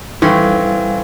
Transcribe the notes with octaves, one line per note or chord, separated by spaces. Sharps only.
A2 E3 G3 C4 C#4 F5